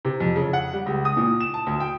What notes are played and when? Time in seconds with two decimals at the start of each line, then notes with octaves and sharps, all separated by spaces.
0.05 C3
0.20 F2
0.36 C#3
0.53 F#5
0.73 G3
0.86 C#2
1.05 D#6
1.17 A#2
1.40 E7
1.54 A5
1.67 D2
1.80 G5